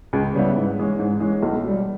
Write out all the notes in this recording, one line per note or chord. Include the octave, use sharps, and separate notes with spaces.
C#2
C#3 G3 B3 E4
G#2
E3 G#3 C#4
G#2
E3 G#3 C#4
B1
B2 G3